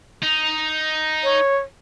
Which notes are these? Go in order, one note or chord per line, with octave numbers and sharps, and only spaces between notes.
D#4
C#5